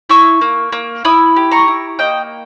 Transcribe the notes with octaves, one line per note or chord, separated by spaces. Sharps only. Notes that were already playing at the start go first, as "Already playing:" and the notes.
E4 C#6 E6
A#3
A#3
E4 B5 D#6
G4
A#5 C#6
E4
A#3 D#5 G5